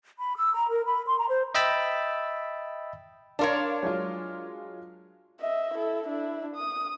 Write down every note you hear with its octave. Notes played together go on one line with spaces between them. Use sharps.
B5
E6
A#5
A#4
B5
C6
A#5
C5
D#5 E5 G5 B5 E6 A6
D4 A#4 C#5 D5 F5 C6
F#3 G#3 F4
D#5 E5
E4 A4
D4 E4
D#6